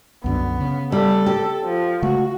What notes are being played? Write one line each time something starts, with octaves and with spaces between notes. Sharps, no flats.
C2 F#2 D3 B3
C#3
G3 A4
G4
F3
C#3 G#3 A3 F#4